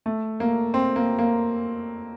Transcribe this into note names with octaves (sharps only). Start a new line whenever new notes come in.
A3
A#3
C4
A#3
A#3